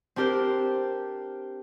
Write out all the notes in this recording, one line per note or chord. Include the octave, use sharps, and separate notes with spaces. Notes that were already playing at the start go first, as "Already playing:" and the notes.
C4 D4 G4 A#4 C5